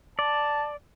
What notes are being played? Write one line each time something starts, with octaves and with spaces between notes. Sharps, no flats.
D5 A5